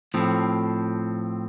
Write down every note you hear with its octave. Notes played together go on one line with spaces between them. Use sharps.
A2 F3 C4